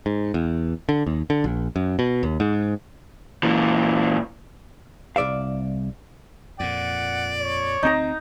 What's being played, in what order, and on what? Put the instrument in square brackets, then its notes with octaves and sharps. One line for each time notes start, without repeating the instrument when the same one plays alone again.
[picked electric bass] G#2
E2
D3
D#2
D3
A#1
F#2
B2
D#2
G#2
[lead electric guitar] A#2 E3
[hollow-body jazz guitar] C2 G#2 D5 E5 F5
[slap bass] F2 A#2 [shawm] D5 [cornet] F#5
[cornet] C#5
[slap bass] D2 C4 [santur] D#4 A#5